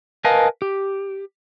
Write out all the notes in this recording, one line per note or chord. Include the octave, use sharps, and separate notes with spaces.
A#4 B4 D#5 F5 G#5 A5
G4